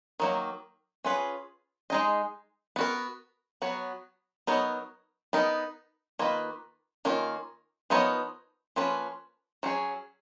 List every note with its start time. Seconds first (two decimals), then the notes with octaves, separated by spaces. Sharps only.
0.20 D#3 F#3 A#3
1.04 C#4 F4 G#4 B4
1.90 G#3 D#4 G#4 D#5
2.76 B3 F#4 A#4
3.62 F#3 B3 F#4 C#5
4.47 F#3 B3 D#4 A#4 C#5
5.33 B3 D#4 A#4
6.19 D#3 A#3 F4 B4 D#5
7.05 D#3 A#3 C#4 F4 A#4
7.90 F3 B3 D#4 A#4 C#5
8.76 F3 A#3 C#4 F4 B4
9.63 F#3 C#4 G#4 C#5